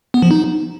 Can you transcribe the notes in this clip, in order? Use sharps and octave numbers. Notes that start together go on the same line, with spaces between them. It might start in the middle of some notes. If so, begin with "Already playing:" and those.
B3
F3
D#4